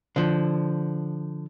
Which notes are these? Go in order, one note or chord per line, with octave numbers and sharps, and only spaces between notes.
D3 F3